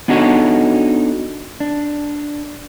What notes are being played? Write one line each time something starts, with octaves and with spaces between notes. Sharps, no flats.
B3 D4 D#4 F#4 A4 C#5
D4